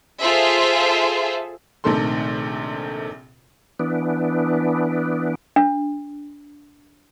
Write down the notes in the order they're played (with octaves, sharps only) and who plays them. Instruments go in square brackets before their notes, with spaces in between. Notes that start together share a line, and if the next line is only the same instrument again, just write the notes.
[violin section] F4 G#4 A4 C5 E5
[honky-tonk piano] A#1 C3 D#3 A3 A4 C6
[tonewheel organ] E3 B3 D4
[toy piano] D4